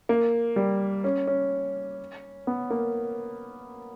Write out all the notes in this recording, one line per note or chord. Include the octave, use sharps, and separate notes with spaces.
A#3
G3
C#4
C#4
B3
A#3